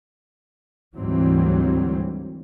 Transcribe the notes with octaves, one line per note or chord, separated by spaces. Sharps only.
D2 G#2 E3 F#3 G3 C4